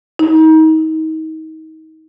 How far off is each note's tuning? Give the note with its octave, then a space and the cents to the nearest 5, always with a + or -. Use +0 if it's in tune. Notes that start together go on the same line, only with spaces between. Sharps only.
D#4 +30